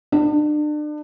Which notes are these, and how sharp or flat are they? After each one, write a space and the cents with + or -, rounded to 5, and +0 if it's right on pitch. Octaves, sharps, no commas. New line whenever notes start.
D4 +35